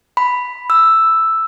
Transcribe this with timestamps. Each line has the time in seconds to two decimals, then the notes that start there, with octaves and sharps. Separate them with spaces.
0.17 B5
0.70 E6